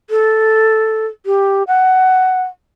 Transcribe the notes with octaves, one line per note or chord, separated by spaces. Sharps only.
A4
G4
F#5